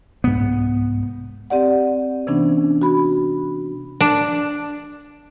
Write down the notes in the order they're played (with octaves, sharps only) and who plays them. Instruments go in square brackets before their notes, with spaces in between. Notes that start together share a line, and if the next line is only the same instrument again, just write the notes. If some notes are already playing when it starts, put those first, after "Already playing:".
[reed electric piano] C2 G#2 [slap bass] B3
[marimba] C4 G4 D5 F#5
C3 E3 B3 C#4 D4
F#4 B5
[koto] D4